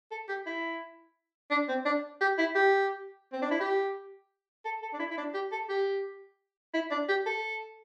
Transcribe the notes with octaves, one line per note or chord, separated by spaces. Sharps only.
A4
G4
E4
D4
C4
D4
G4
E4
G4
C4
D4
E4
G4
A4
A4
D4
E4
E4
D4
G4
A4
G4
E4
D4
G4
A4